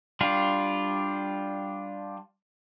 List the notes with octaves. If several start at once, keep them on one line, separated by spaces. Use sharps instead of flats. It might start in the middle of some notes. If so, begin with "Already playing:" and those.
G3 D4 F4